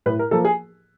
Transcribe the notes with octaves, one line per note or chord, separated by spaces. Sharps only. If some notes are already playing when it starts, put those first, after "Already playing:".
A2 B4
A#4
F3 A#3 A4
G#4